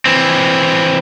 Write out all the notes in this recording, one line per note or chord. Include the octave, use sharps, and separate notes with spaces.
E3 C4